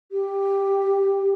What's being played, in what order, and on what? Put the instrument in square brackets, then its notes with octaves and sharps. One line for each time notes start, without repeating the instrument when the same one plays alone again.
[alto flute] G4